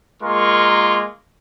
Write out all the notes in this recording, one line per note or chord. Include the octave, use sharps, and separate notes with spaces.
G#3 A#3 F4 A#4 C#6